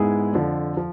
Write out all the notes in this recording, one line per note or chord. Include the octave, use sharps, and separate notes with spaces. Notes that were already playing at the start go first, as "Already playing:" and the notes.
Already playing: G#2 G#3 B3 E4 G#4
F2 D3 F3
F3